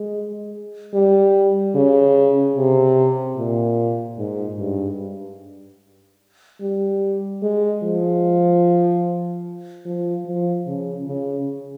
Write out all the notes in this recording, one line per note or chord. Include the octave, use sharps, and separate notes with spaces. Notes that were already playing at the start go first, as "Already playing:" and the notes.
Already playing: G#3
G3
C#3
C3
A#2
G#2
G2
G3
G#3
F3
F3
F3
C#3
C#3